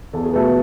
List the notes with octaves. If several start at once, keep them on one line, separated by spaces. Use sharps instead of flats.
E2 A4
G#4
B2 A3 B3 A4